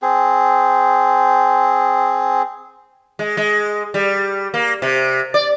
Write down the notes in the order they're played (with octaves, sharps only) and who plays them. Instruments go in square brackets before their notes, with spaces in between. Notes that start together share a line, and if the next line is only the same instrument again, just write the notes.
[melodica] C4 G#4
[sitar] G#3
G#3
G3
A#3
C3
D5